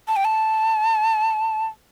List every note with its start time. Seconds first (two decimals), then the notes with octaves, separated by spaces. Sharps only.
0.08 A5
0.16 G5
0.25 A5